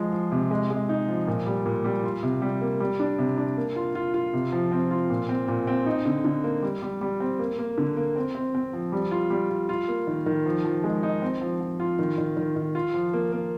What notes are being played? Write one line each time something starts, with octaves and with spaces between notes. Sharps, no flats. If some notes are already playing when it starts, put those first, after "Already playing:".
Already playing: F3 G#3
F3
C3
G#3
G#3
D#4
F3
A#2
G3
A#2
G3
F4
C3
G3
A#3
G3
D4
C3
D4
A#3
F4
F4
F4
C3
F3
C4
F4
A#2
C4
A#2
C4
D#4
D3
D3
A#3
G3
G3
G3
C4
A#3
A#3
D3
A#3
C4
C4
C4
F3
G3
F4
G3
F4
F4
A#3
D#3
D#3
F3
F3
G#3
D#4
C4
F3
F3
F4
D#3
D#3
D#3
D#3
F4
F3
A#3
A#3